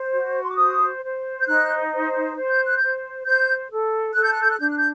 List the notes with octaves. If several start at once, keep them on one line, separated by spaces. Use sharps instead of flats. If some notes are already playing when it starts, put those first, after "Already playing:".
Already playing: C5
F#4
C6
D6
C5 D#6
C5
G6
D#4 F#6
C5
C5
G6
F#6
C5 G6
C5 G6
A4
A4 F#6
G6
F#6
G6
F#6
D4 G6
F#6
G6